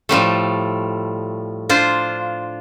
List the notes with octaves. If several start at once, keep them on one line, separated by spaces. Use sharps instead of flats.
A2 F3 G3 A3
D4 F4 C5